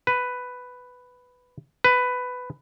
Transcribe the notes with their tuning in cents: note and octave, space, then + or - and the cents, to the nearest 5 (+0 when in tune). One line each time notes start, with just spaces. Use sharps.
B4 +5
B4 +10